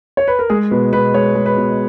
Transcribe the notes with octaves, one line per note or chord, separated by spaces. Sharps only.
C#5
B4
A#4
G#3 G#4
B2 B4
B2 B4
G#3 C#5
G#3
B4
B2